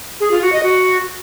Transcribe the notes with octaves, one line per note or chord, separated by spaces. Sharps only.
G#4
F4
F#4
D#5
F#4